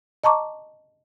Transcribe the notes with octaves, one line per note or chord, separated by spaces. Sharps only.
D#5 A5 A#5 C#6 D6